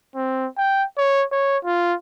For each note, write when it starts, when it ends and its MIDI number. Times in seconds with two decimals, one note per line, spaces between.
0.16 0.47 60
0.58 0.84 79
0.98 1.24 73
1.32 1.58 73
1.65 1.94 65